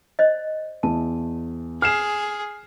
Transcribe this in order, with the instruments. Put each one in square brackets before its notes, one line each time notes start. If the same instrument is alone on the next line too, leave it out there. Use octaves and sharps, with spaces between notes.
[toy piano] C5 D5 D#5
[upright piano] E2 [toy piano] A5
[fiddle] G#4 [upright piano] F6 C7 E7